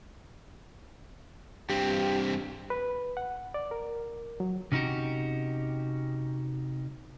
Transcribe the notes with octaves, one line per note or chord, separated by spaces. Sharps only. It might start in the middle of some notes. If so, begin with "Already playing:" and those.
G2 C4 G4
B4
F#5
D5
A#4
F#3
C3 C#4 D#4 F#4 G4